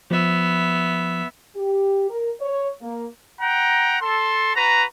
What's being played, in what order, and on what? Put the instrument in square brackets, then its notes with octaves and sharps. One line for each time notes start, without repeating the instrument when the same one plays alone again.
[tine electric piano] F3 [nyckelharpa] B3 E5
[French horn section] G4
A#4
C#5
A#3
[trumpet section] F#5 G5 A#5
A4 C6
F#4 B4 A#5